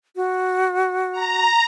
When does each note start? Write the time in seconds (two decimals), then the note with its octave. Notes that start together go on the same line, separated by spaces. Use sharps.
0.16 F#4
1.12 A#5